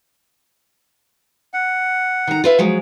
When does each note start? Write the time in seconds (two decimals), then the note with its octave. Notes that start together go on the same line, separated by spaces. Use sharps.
1.54 F#5
2.27 D#3 A#5
2.44 F4 B4 E5
2.59 F3 F#3 G#3